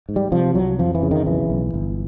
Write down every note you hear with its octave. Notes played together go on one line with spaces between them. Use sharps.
G#2
G3
C3 F3
C2 F#3
F2 F3
E3
C#3
D#3
B1 E3
B1
G1